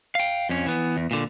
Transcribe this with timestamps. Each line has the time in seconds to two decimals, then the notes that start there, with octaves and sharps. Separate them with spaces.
0.15 F5 G5
0.49 F2 C#4
0.66 E3 B3
0.97 E2
1.11 A#2 D3